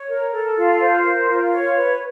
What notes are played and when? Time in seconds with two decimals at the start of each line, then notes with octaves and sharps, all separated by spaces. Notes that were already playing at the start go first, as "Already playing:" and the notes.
Already playing: C#5
0.09 A#4
0.32 A4
0.56 F4
0.80 C5
1.04 A#4
1.28 F4
1.52 C#5
1.75 B4